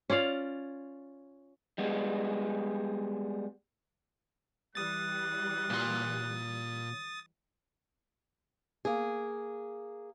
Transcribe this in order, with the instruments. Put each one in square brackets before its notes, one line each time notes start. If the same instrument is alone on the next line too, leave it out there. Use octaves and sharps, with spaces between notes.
[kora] C#4 F4 D5 F5
[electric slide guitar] G3 G#3 B3
[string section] E3 G3 [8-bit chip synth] D#6 A6 [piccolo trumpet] F#6
[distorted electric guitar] A#2 C6
[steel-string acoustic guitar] A#3 G#4